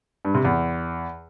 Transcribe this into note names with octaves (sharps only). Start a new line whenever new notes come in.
G2
C3
E2